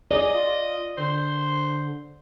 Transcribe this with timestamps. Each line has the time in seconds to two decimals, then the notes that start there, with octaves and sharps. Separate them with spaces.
0.11 G#4 D5 D#5
0.34 F4
0.97 D3 C5